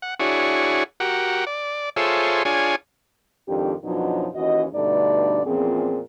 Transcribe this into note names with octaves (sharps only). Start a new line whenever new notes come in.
F#5
D4 E4 F#4 G#4 C#5
F#4 G4 A#4 F#5
D5
F4 G#4 A4 C5 C#5 E5
D4 F4 G#4 C#5 G#5
F2 G#2 D#3 D4 G4
F#2 B2 F3 F#3 D4 D#4
D#2 E3 C#4 F#4 D#5
G2 B2 D3 A3 D#4 D5
E2 A#2 F3 C4 C#4 G#4